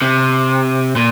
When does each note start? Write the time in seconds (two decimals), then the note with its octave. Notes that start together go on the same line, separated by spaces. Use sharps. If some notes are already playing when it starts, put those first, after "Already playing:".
0.02 C3
0.96 A#2